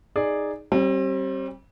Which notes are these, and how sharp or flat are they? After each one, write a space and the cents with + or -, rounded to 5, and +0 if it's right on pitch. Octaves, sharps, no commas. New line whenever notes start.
D#4 +0 G#4 +0 D5 +0
G3 -20 C4 +35